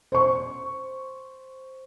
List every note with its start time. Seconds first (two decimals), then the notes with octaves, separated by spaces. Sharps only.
0.12 C5 C#6